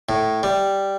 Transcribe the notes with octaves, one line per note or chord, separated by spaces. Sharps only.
A2
G3